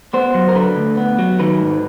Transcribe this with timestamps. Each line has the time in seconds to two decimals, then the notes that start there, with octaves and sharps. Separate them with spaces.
0.14 B3 C5
0.35 F#3
0.49 A#4
0.55 D3 B4
0.76 D2
0.97 B3
1.19 F#3
1.40 D#3 B4
1.61 G#2